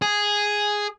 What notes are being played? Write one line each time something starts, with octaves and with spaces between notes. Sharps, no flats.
G#4